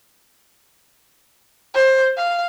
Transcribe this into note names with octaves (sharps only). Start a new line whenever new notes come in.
C5
F5